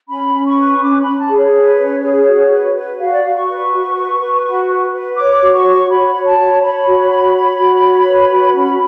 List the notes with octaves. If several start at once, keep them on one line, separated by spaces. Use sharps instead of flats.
C#4 B5
C#4
C#6
B4
C#4 D6
B5
C#4
A5
G#4
C#5
B4
C#4
G#4
F#4
B4
B4
F#4 F5
D5
F#4 F5
C#6
B4
F#4
B4
B4
F#4
B4
B4
C#5 D6
F#4
C#6
C#5
F#4 B5
C#5
A5
C#5
C#5 B5
F#4
C#5
C#5
F#4
C#5
B4
F#4
C#4